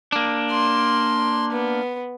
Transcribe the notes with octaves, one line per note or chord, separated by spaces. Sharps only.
A#3 D4
C6
B3